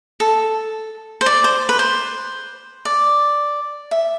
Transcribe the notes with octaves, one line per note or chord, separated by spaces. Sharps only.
A4
C5
D5
C5
B4
C5
D5
E5